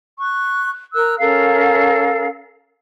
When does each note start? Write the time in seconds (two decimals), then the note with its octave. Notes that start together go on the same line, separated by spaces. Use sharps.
0.19 C#6 F#6
0.94 A#4 E6 F#6
1.19 C#4 A4 A#4 F5